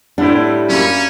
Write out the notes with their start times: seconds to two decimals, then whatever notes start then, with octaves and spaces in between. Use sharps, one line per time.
0.18 A2 G3 C4 D4 E4 F#5
0.69 F#2 A#3 C#4 B5